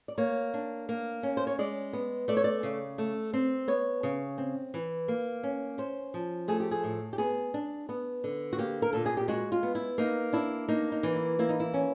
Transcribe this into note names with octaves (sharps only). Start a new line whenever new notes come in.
D5
A#3 C#5
D4
A#3
C#4
C5
C#5
G#3 D5
B3
A3 D5
C#5
D5
C#3
A3
C4
B3 C#5
C#3
C4
E3
A#3
C#4
C#4 C5
F3
A3 G#4
G4
G#4
A2
G4
B3 G#4
D4
B3
D3
F#4
A#3 G4
A#4
A#2 A4
G#4
G4
G#3 F#4
F4
B3
E4
A#3 D#4
D4 E4
A#3 D#4
D#4
E3
E4
A#3 E4
D#4
E4
C#4